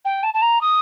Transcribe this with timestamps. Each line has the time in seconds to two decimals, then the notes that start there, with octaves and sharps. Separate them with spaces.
0.05 G5
0.23 A5
0.34 A5
0.42 A#5
0.61 D#6